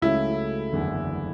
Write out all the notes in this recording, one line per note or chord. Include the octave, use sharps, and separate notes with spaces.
C#2 C#3 F#3 A3 C#4 E4
F#1 E2 D3